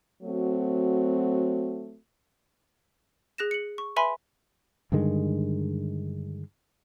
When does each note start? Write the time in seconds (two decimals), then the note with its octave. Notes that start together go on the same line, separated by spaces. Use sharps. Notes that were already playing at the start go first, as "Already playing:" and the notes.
0.23 F#3 A3 C4 F#4
3.38 G#4 F#6 A#6 E7
3.51 C#7 F#7
3.78 C#6
3.96 B4 E5 G#5 B5 C6
4.92 G2 D3 D#3 G#3